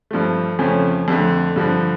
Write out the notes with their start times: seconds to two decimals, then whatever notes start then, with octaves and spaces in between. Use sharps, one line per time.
0.11 G2 F3 A3
0.59 F2 C#3 F3 A3 C#4
1.08 F2 D3 A3
1.56 G2 D3 F3